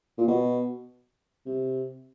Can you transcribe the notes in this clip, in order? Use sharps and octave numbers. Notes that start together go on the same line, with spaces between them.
A#2
B2
C3